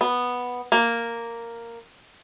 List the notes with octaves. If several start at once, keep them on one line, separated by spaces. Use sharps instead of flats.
B3
A#3